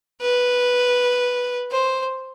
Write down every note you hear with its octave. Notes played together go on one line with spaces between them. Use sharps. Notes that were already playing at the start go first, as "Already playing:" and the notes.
B4
C5